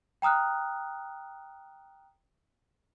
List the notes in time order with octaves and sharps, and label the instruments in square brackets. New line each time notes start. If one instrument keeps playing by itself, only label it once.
[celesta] G5 A#5 D#6 F6 F#6